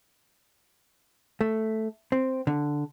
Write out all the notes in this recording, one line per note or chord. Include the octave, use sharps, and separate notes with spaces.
A3
C4
D3